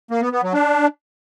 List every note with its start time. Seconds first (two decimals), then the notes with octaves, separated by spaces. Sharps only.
0.11 A#3
0.22 B3
0.32 B3
0.43 F#3
0.54 D4